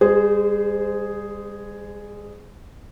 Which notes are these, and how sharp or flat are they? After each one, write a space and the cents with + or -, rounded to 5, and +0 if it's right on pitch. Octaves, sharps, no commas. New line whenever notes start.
G3 +40 G#4 +0 C5 -25